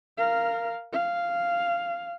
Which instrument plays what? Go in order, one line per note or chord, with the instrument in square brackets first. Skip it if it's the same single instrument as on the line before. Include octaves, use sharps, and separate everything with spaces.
[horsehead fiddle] A#4 F5
F5